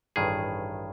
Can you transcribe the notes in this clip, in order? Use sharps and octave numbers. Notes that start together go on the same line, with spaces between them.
A1 G2 D#3 G#4